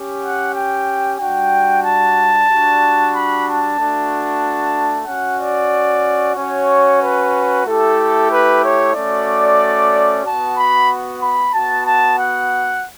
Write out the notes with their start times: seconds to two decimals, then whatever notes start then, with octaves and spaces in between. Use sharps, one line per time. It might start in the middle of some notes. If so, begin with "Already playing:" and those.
Already playing: C#4 G4
0.22 F#5
0.54 G5
1.19 G3 D4 F#4 G5
1.83 A5
2.48 G3 D4 F#4
3.13 B5
3.45 A5
3.78 A3 D4 F#4
5.07 C#4 F#4 F#5
5.39 D5
6.36 C#4 F#4 C#5
7.01 B4
7.65 A3 E4 G4 A4
8.30 B4
8.63 C#5
8.94 A3 C#4 F#4 D5
10.25 B3 F#4 A5
10.57 B5
11.22 B5
11.54 B3 F#4 A5
11.86 A5
12.18 F#5